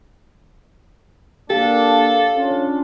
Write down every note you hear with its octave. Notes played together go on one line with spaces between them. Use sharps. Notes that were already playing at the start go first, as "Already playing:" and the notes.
A#3 D4 G4 A4 F5
C#4 D4 F4